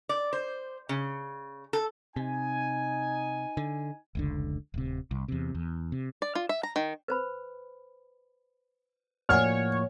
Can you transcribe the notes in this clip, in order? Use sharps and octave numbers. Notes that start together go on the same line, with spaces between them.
D5
C5
C#3
A4
C3 D#4 G#5
D3
F1 C#2 D3
D1 C3
C2
E2 C3
E2
C3
D5
F4
E5
A#5
D#3
B4 C5 B5
A2 F3 A#3 C#5 D5 F#5 G#5 F6